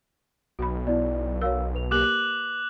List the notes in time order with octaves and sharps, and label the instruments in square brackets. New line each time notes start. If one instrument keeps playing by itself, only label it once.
[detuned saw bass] B1 [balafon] F#4 B5
[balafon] B3 [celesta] E4 D5
[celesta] F#4 F5 E6 [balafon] A#4 C#5
[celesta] B4 F7
[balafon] A#3 G4 A#4 [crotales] D6 F#6 F#7